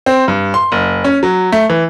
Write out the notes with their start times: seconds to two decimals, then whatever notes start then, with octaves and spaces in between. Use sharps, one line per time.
0.06 C4
0.28 G2
0.54 C6
0.72 F#1
1.04 C#4
1.23 F#3
1.52 A3
1.70 E3